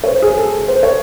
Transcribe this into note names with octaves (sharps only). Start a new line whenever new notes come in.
C#5
C5
G#4
A4
C5
C#5